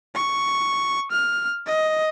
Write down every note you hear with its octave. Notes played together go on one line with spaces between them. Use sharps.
C#6
F6
D#5